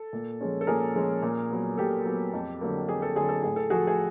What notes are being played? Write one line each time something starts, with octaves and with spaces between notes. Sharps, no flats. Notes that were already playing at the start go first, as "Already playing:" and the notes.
Already playing: A4
A#2
F3 G#3 C#4
A4
A#2 G#4 A#4
F3 G#3 C#4
A#2
F#3 B3
A#2 G4 A4
F#3 B3
F2
D3 F#3 A#3
F2 G#4
A4
D3 F#3 A#3 G#4
A4
A2 G#4
A4
F3 A3 F#4 G#4
G#4